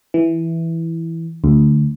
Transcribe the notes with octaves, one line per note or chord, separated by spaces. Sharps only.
E3
D2